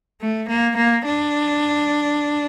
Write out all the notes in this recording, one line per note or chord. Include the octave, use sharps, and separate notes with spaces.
A3
A#3
A#3
D4